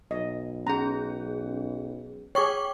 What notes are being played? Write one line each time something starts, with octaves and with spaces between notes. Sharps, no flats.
B1 D#5
C#4 G#4 A#5
G#4 C#5 G5 C#6 D6